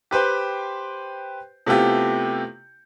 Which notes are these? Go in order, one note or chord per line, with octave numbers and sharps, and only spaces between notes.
G4 B4 C5 G5
C3 A3 B3 E4 F4 G4